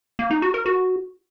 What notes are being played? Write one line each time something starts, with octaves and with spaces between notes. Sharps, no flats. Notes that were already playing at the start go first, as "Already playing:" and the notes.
A#3
D#4
F#4
A#4
F#4